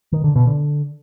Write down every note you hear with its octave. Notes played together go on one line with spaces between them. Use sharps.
D#3
D3
B2
D3